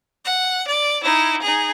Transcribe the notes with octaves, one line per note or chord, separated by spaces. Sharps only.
F#5
D5
D#4 E4
D#4 G#4